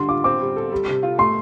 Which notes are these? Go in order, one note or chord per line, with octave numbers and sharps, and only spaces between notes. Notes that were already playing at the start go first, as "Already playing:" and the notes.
Already playing: D3 G3 C6
F4 D6
C4 D6
G3
A4
G3
C3
F4
A3 C6